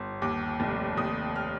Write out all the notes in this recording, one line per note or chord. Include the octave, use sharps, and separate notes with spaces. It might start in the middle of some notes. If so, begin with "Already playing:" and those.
Already playing: G1 C6
D#2 D6
F1
D#2 D#6
F6